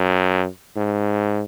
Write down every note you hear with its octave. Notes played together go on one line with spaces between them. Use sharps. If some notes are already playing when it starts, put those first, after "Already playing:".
Already playing: F#2
G#2